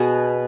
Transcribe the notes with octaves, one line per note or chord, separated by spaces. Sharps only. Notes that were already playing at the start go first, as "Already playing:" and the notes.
Already playing: B2 B3 F#4 G#4